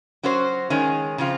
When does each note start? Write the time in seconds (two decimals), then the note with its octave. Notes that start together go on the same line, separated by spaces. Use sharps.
0.23 F#3 C#4 F#4 C5
0.70 D#3 G#3 C#4 G#4
1.18 C#3 F3 C4 F4